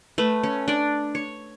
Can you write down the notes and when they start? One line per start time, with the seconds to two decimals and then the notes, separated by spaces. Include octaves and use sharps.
0.18 A3 B4
0.43 C#4
0.68 D4 D5
1.15 C#5